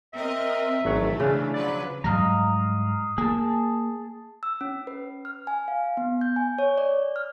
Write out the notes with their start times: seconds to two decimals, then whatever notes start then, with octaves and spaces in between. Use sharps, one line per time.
0.13 C4 A#4 D#5 E5
0.85 G#1 E3 F#3 A3 F#5
1.20 C#3 D4 C5
1.53 F3 F#3 B4 D5
2.04 G#2 F#3 G3 D#5 F5 A#5
3.18 A#3 G#4 A5
4.43 E6
4.61 C#4
4.87 B4
5.25 F6
5.47 G#5
5.68 F5
5.97 B3
6.21 G6
6.36 G#5
6.59 C#5
6.78 D5
7.16 F6